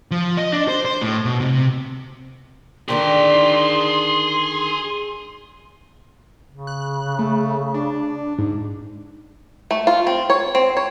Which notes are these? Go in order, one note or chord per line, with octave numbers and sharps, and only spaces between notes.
F3
D#5
D4
C5
C5
A2
B2
C3
D3 D#3 D4 G#4 G5 C6
C#3
F#6
A3
D4
G#2
A3
F4
C4
C#5
C4
C#5